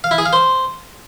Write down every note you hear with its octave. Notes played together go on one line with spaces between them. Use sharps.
F5
E4
G#4
F5
C5